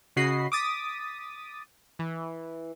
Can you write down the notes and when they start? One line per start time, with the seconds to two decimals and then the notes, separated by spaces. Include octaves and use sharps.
0.16 C#3 F#4 D#5 B5 C7
0.52 D6 D#6 A6 B6
1.99 E3